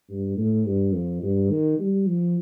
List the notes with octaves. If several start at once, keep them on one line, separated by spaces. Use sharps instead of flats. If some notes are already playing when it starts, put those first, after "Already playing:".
G2
A2
G2
F2
G2
D#3
G3
F3